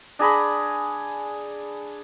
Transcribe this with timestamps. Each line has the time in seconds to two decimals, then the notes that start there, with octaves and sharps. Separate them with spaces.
0.19 D4 G#4 A#5 B5